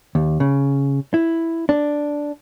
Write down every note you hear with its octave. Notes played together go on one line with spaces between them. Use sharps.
D#2
C#3
E4
D4